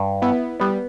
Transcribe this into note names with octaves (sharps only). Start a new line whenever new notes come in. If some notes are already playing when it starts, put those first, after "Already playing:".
Already playing: G2
B3 E4
G3 B3